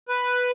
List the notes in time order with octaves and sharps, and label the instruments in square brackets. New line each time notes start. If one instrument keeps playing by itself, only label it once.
[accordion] B4